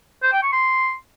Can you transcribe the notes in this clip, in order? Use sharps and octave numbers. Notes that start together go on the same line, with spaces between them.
C5
G5
C#6
C6